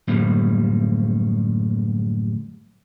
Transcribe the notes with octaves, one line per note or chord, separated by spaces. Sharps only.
F#2 A2 D3 F3 G3 A#3